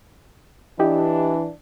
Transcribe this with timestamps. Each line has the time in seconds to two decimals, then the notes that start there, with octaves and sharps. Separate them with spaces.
0.80 E3 D4 E4 G4 D#5